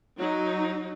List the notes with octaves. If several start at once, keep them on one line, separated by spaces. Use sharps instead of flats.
F#3 D#4